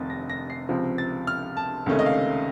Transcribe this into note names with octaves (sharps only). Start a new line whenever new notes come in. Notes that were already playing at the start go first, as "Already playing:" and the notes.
Already playing: F1 F2 C3 D#3 A6
A#6
A#6
C7
C#2 C3 F3 C4
A6
F6
A5
C#2 C3 D#3 A3 C#4
D#5
F5